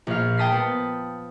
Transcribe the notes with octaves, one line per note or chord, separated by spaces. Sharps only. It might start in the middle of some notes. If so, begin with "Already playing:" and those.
A#1 F5
G5 A5 D#6 B6 C7
B3